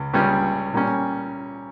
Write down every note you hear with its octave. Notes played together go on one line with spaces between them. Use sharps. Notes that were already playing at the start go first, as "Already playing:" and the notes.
Already playing: C#2 C#3
C#2 C#3 G3 C#4
A#2 G3 C#4